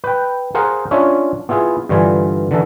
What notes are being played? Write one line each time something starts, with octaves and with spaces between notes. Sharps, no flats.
B4 G5
G#4 A#4 C5 F5 F#5
C#4 D4 F4 C#5 E5
B3 E4 F4 G#4
G2 D3 E3 F4 G#5
D3 E3 A4